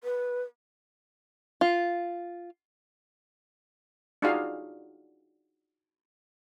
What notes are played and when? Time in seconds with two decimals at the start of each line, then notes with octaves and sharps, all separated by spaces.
0.04 B4
1.61 F4
4.22 D4 D#4 F4 F#4 G#4 F5